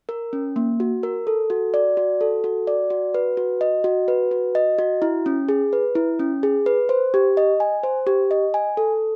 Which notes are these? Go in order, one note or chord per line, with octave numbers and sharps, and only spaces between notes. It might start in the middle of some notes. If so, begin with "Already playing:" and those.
A#4
C#4
A#3
F#4
A#4
A4
F#4
D5
F#4
A4
F#4
D5
F#4
B4
F#4
D#5
F#4
B4
F#4
D#5
F#4
E4
C#4
G#4
B4
E4
C#4
G#4
B4
C5
G4
D#5
G#5
C5
G4
D#5
G#5
A4